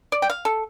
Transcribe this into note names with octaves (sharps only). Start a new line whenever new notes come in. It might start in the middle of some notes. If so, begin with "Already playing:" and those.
D5
G5
F5
A4